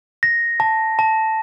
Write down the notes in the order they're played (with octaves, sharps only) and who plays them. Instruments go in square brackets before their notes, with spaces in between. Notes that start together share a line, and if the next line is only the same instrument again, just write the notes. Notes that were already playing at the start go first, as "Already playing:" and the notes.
[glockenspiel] A#6
A5
A5